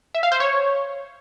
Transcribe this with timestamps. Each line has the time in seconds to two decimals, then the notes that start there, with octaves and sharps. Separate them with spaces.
0.15 E5
0.23 F5
0.32 C5
0.40 C#5